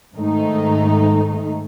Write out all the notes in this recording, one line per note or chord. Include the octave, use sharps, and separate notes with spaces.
G#2 D#3 A3 D#4